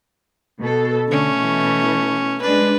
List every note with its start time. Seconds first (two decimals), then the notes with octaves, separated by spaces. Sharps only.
0.60 B2 A4
1.09 D3 A3 C#4
1.38 B2 E3
2.42 G#3 D4 B4